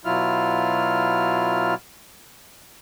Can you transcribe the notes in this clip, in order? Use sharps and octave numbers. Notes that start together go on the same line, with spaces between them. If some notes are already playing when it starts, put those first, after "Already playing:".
B2 F#3 E4 F4 F6